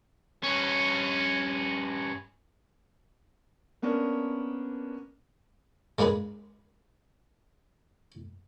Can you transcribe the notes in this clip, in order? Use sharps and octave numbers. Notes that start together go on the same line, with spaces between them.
G2 C#4
A#3 B3 C#4 D4 A#4
G#3 A#3 D4 G#4 B4